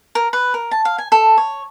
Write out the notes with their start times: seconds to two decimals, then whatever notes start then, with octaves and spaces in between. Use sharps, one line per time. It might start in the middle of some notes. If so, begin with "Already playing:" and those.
0.15 A#4
0.33 B4
0.54 A#4
0.71 A5
0.85 F5
0.98 G#5
1.12 A4
1.38 C#5